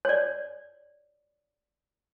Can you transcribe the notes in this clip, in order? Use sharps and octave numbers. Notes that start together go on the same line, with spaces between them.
C#5 D5